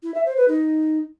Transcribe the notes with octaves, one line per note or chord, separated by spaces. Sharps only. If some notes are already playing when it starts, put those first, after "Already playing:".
E4
E5
C5
B4
D#4